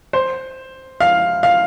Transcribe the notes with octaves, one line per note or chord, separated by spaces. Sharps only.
C5
F5
F5